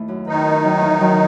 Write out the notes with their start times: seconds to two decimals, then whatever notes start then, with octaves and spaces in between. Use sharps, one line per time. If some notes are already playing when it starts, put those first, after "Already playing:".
Already playing: D#2 A3 E4
0.08 F#2
0.27 D#3 D#4 B4
0.46 E4
0.64 F#3
0.81 E2
1.01 F#3